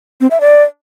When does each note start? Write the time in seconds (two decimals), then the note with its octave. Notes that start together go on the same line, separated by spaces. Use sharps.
0.21 C4
0.31 E5
0.41 D5